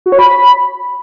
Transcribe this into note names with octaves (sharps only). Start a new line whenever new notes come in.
F#4
C#5
B5